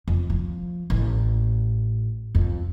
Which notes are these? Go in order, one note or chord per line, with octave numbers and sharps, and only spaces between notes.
F2
F3
A1
F2